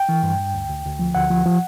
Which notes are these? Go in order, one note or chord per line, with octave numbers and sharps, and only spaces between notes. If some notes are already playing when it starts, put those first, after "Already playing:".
Already playing: G5
E3
G2
G2
D2
D2
D2
F3
D2 F#5
F3
F3